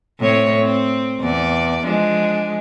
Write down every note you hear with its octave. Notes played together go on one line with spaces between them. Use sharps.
A2 C4 C#5
C4
E2 D5
F3 G#3 D4